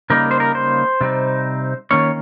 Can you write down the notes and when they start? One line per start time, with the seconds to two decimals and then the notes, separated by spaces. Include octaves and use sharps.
0.10 C#3 G3 A#3 D#4 A#4
0.31 C5
0.40 A#4
0.55 C5
1.01 C3 G3 C4 D#4
1.91 D#3 A#3 C#4 C#5